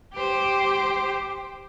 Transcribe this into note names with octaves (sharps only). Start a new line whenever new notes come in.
G4 C5